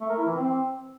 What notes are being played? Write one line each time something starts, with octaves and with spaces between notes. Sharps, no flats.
A3
A#4
E4
E3
C4